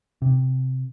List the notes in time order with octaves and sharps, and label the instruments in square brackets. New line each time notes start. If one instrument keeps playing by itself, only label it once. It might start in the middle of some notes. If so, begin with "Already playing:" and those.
[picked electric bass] C3